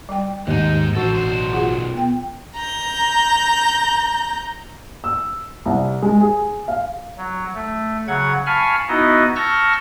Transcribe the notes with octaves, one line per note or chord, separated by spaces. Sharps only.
G3 G5
D#2 G#2 D#4
A1 F#4 A4 C5
B1 C5
F4 G#4 F#5
B3 G5
A#5 G6
E6
C2
G#3
G#4
F5
F#3
A3
C#3 F#3 F#5 G#6
F5 G#5 A5 B5 C#6 F6
B3 D#4 E4 F#4 D#5
A5 C#6 E6 F6 G6 A#6